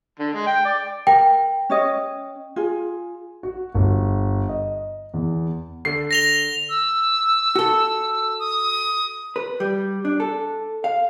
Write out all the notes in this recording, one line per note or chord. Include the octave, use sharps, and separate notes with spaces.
D3
G#3
G5
D5
A#4 G5
C#4 C#5 D#5
F4 G#4
F#4
G1
D#5
E2
D3 C7
A#6 F7 G7
E6
F#4 A4
D#6
B4
G3
D4
A4
F5